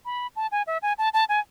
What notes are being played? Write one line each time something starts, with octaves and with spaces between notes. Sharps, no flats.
B5
A5
G#5
E5
G#5
A5
A5
G#5